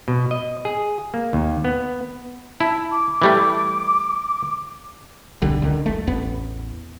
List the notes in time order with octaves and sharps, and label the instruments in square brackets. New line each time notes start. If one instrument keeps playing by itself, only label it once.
[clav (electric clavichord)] B2
D#5
G#4
A#3
D#2
B3
[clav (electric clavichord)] E4 [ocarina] A5
[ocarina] D6
[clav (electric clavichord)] E3 G3 A3
[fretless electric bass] D#1 B1 D3 G3
C#2 D3 D#3
F#1 A3
A1 E2 B3